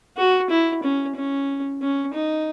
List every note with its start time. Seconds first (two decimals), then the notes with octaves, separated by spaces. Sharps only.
0.17 F#4
0.50 E4
0.83 C#4
1.16 C#4
1.82 C#4
2.14 D#4